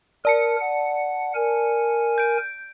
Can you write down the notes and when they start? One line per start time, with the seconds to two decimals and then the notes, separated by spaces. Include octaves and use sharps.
0.25 A#4 D5 A5 C#7
0.60 F#5
1.35 A#4 G#5
2.18 G6 D7